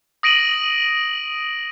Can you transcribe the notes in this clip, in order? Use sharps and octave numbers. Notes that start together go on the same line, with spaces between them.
D#6 A#6 D7 D#7 F#7